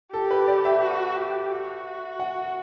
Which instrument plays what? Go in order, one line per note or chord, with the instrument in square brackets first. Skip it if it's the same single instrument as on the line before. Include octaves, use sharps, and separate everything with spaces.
[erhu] G4 [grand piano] A4
[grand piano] B4
D5
E5
[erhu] F#4
G4
F#4
[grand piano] F#5